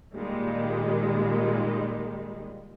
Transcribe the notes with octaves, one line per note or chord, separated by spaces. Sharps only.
A#2 D#3 G3 G#3